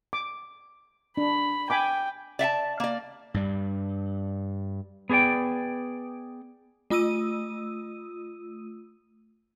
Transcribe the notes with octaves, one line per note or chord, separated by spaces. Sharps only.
D6
D4 B5
G5 G#5 B5 D6
D5 E5 F#5 A5
A#3 D5
G2 G3
B3 G#4 B4 D5 G5
A3 F4 D#6 E6 D#7